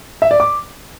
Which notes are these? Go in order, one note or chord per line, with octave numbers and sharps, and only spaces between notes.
E5
D5
D6